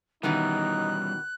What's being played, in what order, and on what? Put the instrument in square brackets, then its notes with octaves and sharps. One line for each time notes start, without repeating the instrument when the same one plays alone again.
[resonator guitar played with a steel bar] B2 D#3 E3 [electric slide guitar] G3 C#4 [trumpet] D#4 [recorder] F#6